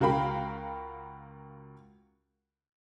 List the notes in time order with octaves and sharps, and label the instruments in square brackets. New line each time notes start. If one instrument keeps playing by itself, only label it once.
[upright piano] C#2 F#4 A#4 F5 G5 B5